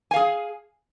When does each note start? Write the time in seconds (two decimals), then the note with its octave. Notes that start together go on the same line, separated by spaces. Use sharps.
0.11 G#5
0.14 F5
0.16 G#4